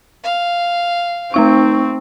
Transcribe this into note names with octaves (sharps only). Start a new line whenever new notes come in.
F5
A3 C4 D#4 C#6